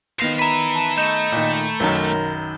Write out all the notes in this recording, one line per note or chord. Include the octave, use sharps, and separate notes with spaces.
D#3 B3 C5 F5 A#6
B4 E5 A#5 B5
A5
A3 D#5 G6 E7
A#2 D#3
B1 F#2 D#3 A#4 G7